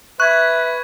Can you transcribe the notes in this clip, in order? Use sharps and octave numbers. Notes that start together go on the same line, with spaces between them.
B4 E5 C#6 F#6 G#6